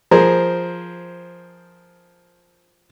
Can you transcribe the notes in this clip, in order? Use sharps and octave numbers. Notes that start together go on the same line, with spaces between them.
F3 G#4 A#4 C5